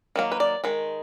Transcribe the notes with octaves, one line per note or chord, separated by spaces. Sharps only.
D#3 F#3 A#3
B4
D5
D#3 G#3